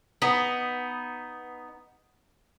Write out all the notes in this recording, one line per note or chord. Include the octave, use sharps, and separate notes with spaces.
B3 D#4